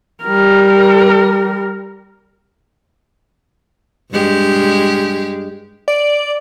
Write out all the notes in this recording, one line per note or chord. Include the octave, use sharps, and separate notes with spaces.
G3 A#4
G2 G#3 G4
D5